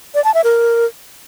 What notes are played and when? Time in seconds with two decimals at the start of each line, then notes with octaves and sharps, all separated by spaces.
0.15 D5
0.24 A5
0.34 E5
0.44 A#4